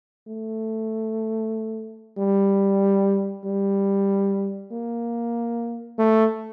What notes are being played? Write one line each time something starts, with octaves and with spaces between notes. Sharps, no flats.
A3
G3
G3
A#3
A3